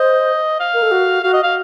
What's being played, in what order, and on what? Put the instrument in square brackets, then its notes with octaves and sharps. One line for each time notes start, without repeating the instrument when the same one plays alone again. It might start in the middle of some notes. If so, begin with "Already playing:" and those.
Already playing: [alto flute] C5 [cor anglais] D#5
[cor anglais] F5
[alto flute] A#4
A4
F#4
[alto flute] F#4 [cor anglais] F5
[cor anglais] D#5
F5